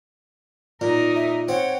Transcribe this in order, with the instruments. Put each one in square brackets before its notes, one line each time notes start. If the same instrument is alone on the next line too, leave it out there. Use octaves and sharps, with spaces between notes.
[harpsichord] A#2 [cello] D#4 A#4
[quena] E5
[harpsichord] C4 [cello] C#5 G5 [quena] F#5